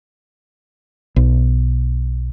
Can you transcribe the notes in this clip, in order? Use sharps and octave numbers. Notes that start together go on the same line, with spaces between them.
B1